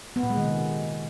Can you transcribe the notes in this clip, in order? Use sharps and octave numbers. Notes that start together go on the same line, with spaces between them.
B3
A#2
G#3
D#3
C3